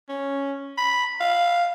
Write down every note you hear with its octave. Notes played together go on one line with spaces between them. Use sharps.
C#4
B5
F5